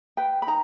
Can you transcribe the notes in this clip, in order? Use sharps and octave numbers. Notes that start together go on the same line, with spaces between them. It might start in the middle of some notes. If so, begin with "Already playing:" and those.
B4 G5
B5
D#4 A#5